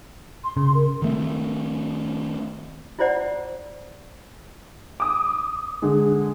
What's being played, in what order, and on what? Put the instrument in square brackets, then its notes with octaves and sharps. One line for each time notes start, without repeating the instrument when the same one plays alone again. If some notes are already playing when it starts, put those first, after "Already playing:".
[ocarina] C6
[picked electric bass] C#3
[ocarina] A#4
[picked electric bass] D#3 A3 C4
[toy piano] E4 F4 C5 D5 F#5
[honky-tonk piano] D6 D#6
D3 G#3